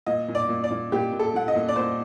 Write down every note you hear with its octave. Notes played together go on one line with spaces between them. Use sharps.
A#2 D#5
A#2
D5
A#2
D5
A#2
A#2 G4
A#2
A4
A#2 F#5
D#5
A#2
D5
A#2 C5